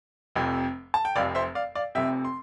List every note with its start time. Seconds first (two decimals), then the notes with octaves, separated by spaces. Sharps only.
0.36 F1 F2 C3
0.94 A5
1.05 G5
1.16 F1 F2 C3 D5 F5
1.35 C5 E5
1.55 D5 F5
1.75 D5 F5
1.95 F1 F2 C3 E5 G5
2.25 C6